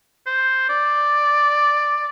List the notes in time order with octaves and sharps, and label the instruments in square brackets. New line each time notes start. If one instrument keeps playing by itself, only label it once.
[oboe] C5
D5